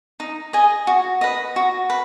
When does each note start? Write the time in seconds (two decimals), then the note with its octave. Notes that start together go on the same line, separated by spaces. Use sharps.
0.20 D#4
0.53 G#4 D#5 G#5
0.87 F#4
1.21 B4 D#5
1.56 F#4
1.90 B4